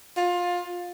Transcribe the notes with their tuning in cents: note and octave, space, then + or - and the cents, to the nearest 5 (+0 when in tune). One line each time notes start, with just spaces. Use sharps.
F4 +20